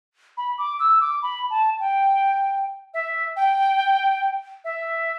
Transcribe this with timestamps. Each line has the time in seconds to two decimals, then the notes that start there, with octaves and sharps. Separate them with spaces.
0.37 B5
0.58 D6
0.80 E6
1.01 D6
1.22 B5
1.50 A5
1.80 G5
2.94 E5
3.36 G5
4.64 E5